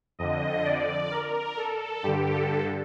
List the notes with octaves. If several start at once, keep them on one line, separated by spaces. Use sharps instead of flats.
F2 D3 D#5
D5
A#4
A4
G2 D3 G4
A4